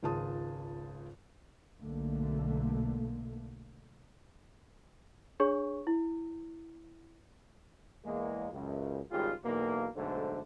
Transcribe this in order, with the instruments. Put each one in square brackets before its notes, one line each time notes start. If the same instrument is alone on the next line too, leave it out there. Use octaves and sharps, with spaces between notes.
[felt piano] G#1 C#2 F4 G#4 A5 D#6
[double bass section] B1 B2 D3 A3 A#3
[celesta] D4 G#4 C#5 C#6
E4
[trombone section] E2 G#3 A#3
C#2 F#2
G#1 C#2 G3 F4 G4 G#4
B1 E2 B2 A#3
B1 G#2 D3 A3 C5